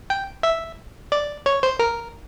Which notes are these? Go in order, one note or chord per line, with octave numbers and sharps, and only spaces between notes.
G5
E5
D5
C#5
C5
A#4